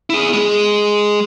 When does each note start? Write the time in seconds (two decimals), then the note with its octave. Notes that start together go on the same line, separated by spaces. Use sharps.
0.10 E4 G#4
0.33 G#3 G#4